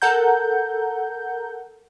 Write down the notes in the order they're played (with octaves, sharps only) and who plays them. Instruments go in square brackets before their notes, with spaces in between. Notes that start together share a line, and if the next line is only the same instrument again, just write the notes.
[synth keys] A4 A#4 F#5 A#5 G6